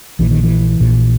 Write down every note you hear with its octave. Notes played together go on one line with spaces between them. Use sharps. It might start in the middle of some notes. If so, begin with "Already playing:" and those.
A#1 A#2 E3
D#3
E3
A#1 A#2